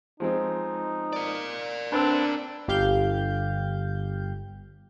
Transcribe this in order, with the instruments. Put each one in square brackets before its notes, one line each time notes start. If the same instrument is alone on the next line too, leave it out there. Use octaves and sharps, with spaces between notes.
[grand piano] F3 G#3 C4 [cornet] D#4
[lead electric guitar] A#4 D5
[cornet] C4 [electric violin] D4 [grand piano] B4 E6
[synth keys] G1 G4 F5 G6